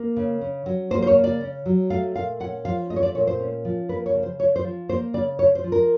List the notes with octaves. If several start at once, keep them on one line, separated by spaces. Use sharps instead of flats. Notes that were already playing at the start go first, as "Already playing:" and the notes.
Already playing: A#3
C#3
C#4
F#3
A#3 C5
C5
C#5
C#3
D5
C#4
F#3
A3 F5
A#2 F5
C#4 F#5
F3 F5
A3 D#5
C#5
D5
A#2 C#5
C5
C#4
F3
A#3 B4
C#5
C#3
C5
C#4 C#5
C5
F3
A#3 C5
C#3 D5
C#4 C#5
C5
F3
A#4